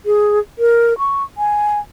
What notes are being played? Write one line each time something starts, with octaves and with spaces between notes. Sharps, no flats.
G#4
A#4
C#6
G#5